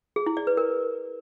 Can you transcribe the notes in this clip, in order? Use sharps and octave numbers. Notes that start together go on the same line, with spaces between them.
G#4
E4
D5
B4
A#4